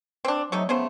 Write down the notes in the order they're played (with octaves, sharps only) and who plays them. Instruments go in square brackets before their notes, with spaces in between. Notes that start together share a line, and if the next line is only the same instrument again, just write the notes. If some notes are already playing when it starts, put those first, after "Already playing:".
[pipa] C4 D4
[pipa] C3 A3 D#4 [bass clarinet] F#3
[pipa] C#3 A3 C5 [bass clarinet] B3